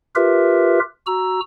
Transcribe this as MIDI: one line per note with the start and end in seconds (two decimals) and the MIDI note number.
0.15 0.79 65
0.15 0.79 67
0.15 0.79 70
0.15 0.79 71
0.15 0.79 76
1.07 1.40 66
1.07 1.40 82
1.07 1.40 88